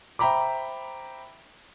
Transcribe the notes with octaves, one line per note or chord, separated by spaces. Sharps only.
C5 E5 G5 A#5 B5 D6